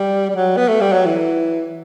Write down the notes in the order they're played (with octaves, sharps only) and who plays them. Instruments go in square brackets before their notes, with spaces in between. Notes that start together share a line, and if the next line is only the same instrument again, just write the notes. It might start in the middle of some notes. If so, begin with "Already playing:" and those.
Already playing: [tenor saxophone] G3
G3
F#3
B3
A3
G3
F#3
E3